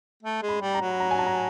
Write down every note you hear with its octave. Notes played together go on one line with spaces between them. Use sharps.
A3
G#3
B5
G3
A#5
F#3
A#5
G#5
A5
A#5